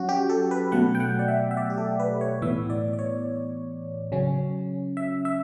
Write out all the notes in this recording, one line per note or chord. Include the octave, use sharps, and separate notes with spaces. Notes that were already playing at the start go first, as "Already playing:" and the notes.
Already playing: F#3 C#4 F#4
G4
A4
B4
B2 F#3 A3 F#5
G5
F#5
D5
E5
E5
D5
G4
A4
B4
C#5
A2 E3 B3 E5
D5
D5
C#5
C#3 F#3 C#4
E5
E5